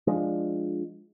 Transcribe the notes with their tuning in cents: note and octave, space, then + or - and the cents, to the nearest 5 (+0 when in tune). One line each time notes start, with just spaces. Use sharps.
F3 +0 G#3 +0 D4 +0